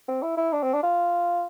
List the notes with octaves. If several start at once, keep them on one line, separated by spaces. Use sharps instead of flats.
C4
E4
E4
D4
C4
D4
F4